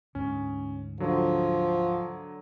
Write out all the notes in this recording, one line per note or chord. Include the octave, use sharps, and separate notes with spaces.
D2 G#2 C#4
D3 F3 F#3